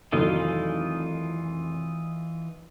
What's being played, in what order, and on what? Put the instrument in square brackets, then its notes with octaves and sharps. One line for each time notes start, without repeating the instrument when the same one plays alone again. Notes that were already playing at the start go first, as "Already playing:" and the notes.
[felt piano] F1 D#3 F#3 [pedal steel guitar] E3 D#4 F4